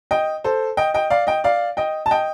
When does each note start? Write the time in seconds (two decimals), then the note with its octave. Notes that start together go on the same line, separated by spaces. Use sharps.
0.11 D#5 G5
0.44 A4 C5
0.77 D#5 G5
0.94 D#5 G5
1.10 D5 F5
1.27 D#5 G5
1.44 D5 F5
1.77 D#5 G5
2.06 A5
2.11 D#5 G5